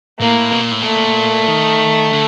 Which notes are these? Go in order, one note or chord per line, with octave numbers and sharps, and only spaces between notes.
A2 A#3
B2
A#2
A2
A#2 A3
D#3
D3